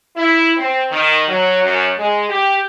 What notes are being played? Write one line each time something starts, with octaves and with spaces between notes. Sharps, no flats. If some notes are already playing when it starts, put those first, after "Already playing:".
E4
C4
D#3
F#3
F#2
G#3
G4